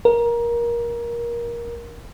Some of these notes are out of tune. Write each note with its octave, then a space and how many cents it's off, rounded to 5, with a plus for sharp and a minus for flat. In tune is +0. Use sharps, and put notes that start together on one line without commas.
A#4 +20